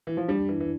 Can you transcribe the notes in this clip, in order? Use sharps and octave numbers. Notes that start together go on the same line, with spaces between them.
E3
F3
G3 D4
E3
E3